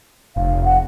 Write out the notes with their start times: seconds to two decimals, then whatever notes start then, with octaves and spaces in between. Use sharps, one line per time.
0.36 F1 F5
0.64 F#5